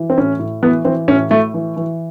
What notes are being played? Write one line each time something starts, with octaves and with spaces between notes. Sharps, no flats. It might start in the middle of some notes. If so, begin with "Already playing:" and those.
Already playing: E3
C4
A2 C#4
A2
E3 B3
E3 C4
A2 C#4
A2 A3
E3
E3